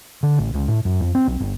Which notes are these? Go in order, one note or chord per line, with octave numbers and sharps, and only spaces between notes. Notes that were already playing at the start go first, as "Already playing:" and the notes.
D3
A1
C#2
A2
F#2
F2
C4
B1
G1